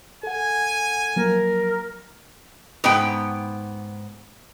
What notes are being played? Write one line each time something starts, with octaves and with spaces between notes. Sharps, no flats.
A4 F#5 G#5
F3 F#3 A#3 A#4
G#2 B3 G5